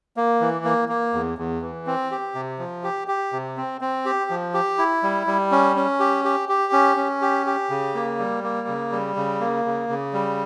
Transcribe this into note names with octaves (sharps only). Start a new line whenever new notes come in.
A#3
E3
A#3
A#3
E2
E2
E3
C4
G4
C3
F3
G4
G4
C3
C4
C4
G4
F3
G4
E4
G3
G3
C#4
C#4
G4
G4
G4
C#4
C#4
G4
G4
C#3
A#3
G3
A#3
C#3
G3
C#3
A#3
C#3
C#3
G3